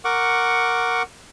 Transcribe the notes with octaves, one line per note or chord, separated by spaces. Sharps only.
A#4 F#5 C#6 D6